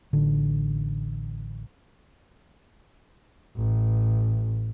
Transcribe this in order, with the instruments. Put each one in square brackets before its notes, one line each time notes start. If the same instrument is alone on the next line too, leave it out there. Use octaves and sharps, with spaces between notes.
[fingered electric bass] A1 D3
[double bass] A1